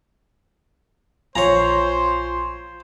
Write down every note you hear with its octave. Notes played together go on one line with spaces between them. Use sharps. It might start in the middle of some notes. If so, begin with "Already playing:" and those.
A#1 F4 C5 C#5 G#5 A#5 C6 C#6